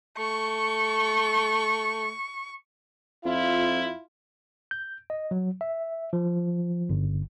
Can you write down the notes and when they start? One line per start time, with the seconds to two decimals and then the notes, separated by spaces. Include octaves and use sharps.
0.19 A3 C#6
3.25 F2 E4 F4
4.71 G6
5.10 D#5
5.31 F#3
5.61 E5
6.13 F3
6.89 G1